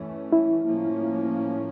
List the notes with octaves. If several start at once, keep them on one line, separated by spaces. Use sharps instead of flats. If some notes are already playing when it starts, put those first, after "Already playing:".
Already playing: E3 A3 C#4
E4
A2 F3 A#3 C#4